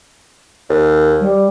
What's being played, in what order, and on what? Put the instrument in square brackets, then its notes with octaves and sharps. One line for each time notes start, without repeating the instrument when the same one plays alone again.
[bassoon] D#2
[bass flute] G3